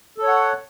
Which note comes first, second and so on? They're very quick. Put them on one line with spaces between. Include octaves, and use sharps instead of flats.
A4 C#5 F#5